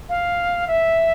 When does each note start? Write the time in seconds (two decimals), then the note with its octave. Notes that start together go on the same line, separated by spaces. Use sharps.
0.09 F5
0.67 E5